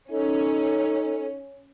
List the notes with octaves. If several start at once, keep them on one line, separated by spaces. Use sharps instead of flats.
C#4 D#4 A4